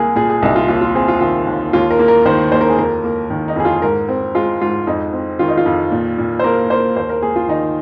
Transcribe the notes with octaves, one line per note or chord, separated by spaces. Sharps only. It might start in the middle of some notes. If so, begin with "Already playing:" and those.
Already playing: C2 A#3 G#4
A#2 G#4
G#4
C2 D#4
F4
D#2 F4
F4
C4 G#4
F4
D#3 F4
D#2
D#2 F4
A#4
A#3
A#4
D#3 C5
D#2 C5
A#4
G#4
F2 A#4
A#3
D#3
D#4
F2 G#4
F4
G#2 A#4
C4
G#3 F4
G#2 F4
F2 D#4
C4
D#3 F4
D#4
F4
F2
A#2
A#2
C5
A#3 A#4
A#3 C5
D#2 C5
A#4
A#3 G#4
F4
D#3 D#4